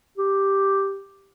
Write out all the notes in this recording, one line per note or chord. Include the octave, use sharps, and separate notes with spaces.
G4